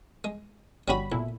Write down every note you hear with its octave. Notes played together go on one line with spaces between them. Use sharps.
G#3
G1 G3 C#4 F#4 B5
B1 A#2 E4